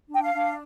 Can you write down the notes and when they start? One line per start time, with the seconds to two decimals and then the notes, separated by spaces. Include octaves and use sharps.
0.09 D4
0.15 G5
0.21 F5
0.33 D4